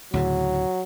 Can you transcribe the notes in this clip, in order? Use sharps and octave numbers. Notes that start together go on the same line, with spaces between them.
D2 A2 C#3 F#3